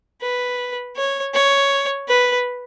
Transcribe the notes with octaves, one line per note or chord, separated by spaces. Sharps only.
B4
C#5
C#5
B4